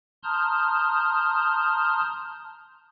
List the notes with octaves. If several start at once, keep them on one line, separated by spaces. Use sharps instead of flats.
A5 A#5 C6 D#6 F6 G6